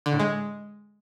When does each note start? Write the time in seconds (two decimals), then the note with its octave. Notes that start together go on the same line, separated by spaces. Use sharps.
0.06 D3
0.13 A2
0.19 G#3